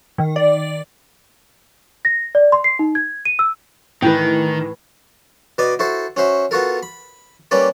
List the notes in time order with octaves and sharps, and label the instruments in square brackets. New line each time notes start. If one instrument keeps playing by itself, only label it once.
[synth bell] D#3
D5
[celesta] A#6
D5
C6
C7
D#4
G#6
D#7
E6
[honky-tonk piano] A2 E3 [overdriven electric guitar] D#3 [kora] B4 G5
[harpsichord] B2 B3 D5 D#5 D6
E4 F#4 A4 C5
C#4 F#4 C5 E5
B3 F4 F#4 A4 A#4
B5
G3 A#3 C#4 B4 D5